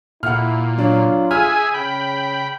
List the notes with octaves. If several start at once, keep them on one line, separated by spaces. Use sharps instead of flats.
A#2 E4 F#5 F6
F#3 D4 F4
G#4 E5 G#5 F6
C#3 G5 B5